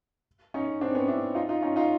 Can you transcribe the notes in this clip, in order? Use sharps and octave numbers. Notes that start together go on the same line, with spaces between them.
C#4 D#4
C4 D4
B3 C#4
D4 E4
D#4 F4
D#4 F4
C#4 D#4
D#4 F4